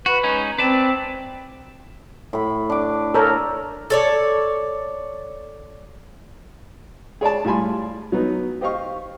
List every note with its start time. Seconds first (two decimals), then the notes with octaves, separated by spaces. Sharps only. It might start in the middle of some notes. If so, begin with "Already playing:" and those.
0.06 F#4 B4
0.23 G#3 C#4 D#4
0.59 C4 B4 D5 A5
2.33 A2 B5
2.70 D4 D6
3.14 A4 A#4 C#5
3.90 A4 C#5 D5
7.21 G#4 C#5 D5 A5
7.45 A2 G3 F4 G#5 B5 C6
8.12 F#3 B3 D#4
8.61 G4 C5 D#5 F5 C#6